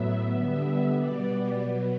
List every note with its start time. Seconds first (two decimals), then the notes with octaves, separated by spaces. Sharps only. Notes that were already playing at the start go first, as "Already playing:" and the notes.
Already playing: A2 F#3 B3 E5
0.31 D3 G3 B3 E5
0.94 B2 G3 B3 D5
1.57 B2 F#3 B3